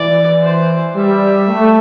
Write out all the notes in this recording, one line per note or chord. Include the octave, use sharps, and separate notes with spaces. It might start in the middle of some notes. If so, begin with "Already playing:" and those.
Already playing: E3 D5
C5
G3 E5
A3